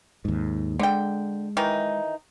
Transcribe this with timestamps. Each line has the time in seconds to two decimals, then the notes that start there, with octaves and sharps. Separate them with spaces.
0.25 D#2 G#2
0.79 D3 G#3 G5
1.57 D#3 E3 D#4